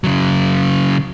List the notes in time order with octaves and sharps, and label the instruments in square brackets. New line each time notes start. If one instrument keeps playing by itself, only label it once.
[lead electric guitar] C#3 F#3